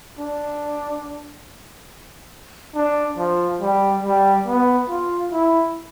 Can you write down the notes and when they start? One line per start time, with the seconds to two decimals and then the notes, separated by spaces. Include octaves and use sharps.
0.19 D4
2.75 D4
3.18 F3
3.61 G3
4.03 G3
4.47 B3
4.89 F4
5.32 E4